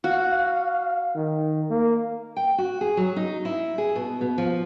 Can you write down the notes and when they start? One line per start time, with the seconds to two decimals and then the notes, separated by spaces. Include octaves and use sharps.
0.04 F#4 F5
1.16 D#3
1.70 A#3
2.36 G5
2.58 F#4
2.81 G#4
2.97 F#3
3.16 D#4
3.45 E4
3.78 G#4
3.96 B2
4.21 B2
4.38 F3